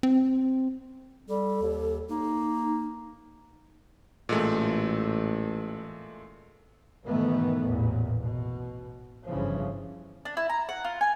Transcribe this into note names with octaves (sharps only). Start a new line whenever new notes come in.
C4
G3 A4
D#2
A#3 D#4
A1 A#2 G#3 A3
G#2 B2 D#3 E3 A3 B3
A1 E2 A#2
B2
G1 G2 C#3 E3 F3
D4
E4
A#5
F#5
F4
G#5